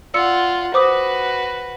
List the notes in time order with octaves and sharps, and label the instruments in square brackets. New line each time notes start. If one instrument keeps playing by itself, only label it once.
[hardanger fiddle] F4 F#5 [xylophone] D5 E6 C#7
[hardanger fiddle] F#4 B4 [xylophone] C5 D6 D#6